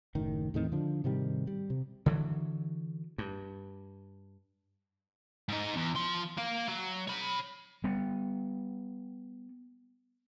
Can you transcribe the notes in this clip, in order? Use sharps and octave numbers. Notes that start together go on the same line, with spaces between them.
F#1 A2 D#3
E2 A2 D#3 C4
D3 F3 D4
G#2 C3 D#3 G3
G3
C3
D3 E3 F#3
G2
G#2 D#4
E2
F3 C6
A#3 F5
F#3
C#5 B5
G3 B3